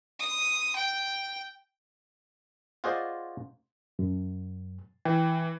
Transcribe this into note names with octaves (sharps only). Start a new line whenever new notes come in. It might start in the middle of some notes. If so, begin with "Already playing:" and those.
D#6
G5
F4 F#4 G#4 C5 D5 D#5
F#2
E3 G5